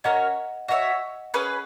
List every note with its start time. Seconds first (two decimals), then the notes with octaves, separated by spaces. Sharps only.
0.04 C#4 F#4 A#4 C#5 D#5 F#5
0.68 F#4 A#4 C#5 D#5 E5 F#5
1.34 C#4 G#4 B4